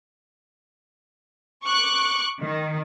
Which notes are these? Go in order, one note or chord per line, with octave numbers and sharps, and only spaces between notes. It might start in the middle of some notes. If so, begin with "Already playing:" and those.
C#6 D6 F#6
D#3